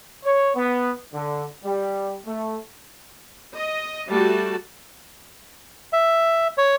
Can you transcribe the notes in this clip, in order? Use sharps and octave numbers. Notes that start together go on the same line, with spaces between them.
C#5
B3
D3
G3
A3
D#5
G3 A3 F#4 A5
E5
C#5